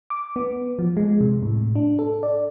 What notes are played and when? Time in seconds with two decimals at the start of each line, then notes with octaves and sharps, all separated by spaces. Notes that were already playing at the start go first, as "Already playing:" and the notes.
0.10 D6
0.36 B3
0.79 F3
0.97 G#3
1.21 C3
1.43 A2
1.75 D4
1.99 A4
2.23 D5